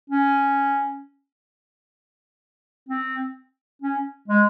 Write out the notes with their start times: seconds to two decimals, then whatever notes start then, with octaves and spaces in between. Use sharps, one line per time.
0.10 C#4
2.89 C4
3.82 C#4
4.28 G#3